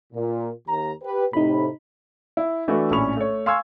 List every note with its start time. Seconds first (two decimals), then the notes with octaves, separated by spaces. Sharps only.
0.13 A#2
0.67 D#2 A#5
1.03 G4 B4
1.33 A2 C3 D#4 B5
2.37 E4
2.68 E3 A3 D4 E4 F#4
2.91 A#1 A2 C#4 B5 C#6 F7
3.17 A3 C#5
3.46 F5 G#5 C6 C#6 E6 G#6